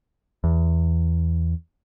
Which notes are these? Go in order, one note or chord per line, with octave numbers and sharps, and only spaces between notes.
E2